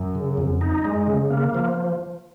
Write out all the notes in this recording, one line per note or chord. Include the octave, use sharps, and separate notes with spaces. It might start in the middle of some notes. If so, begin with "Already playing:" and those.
Already playing: F#2
C#3
F2
D#4
G#3
C#3
A#3
F3